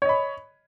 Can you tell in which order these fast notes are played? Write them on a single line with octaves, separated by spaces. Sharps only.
C#5 D#5 B5